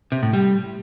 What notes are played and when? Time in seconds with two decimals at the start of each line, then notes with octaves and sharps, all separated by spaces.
0.12 C3
0.23 A2
0.33 G3